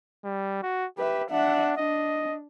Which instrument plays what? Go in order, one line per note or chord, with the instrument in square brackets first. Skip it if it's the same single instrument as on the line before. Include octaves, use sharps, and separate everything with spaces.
[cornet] G3
F#4
[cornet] G4 [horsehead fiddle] B4 E5
[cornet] D4 [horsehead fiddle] E5 F#5
[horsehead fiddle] D4 [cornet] D#5